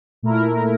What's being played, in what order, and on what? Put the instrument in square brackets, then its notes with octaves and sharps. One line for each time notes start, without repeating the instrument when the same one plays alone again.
[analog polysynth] A#2 A3 E4 A#4